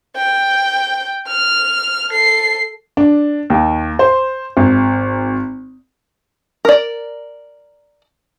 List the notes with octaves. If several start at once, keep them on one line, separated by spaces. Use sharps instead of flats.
G5
F6
A4 C7
D4
D#2
C5
G#1
A#4 D5